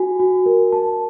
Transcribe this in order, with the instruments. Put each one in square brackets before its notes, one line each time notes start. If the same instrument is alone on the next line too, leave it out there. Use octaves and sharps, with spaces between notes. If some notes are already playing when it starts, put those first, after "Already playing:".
Already playing: [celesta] F#4 G#5
F#4
A#4
A5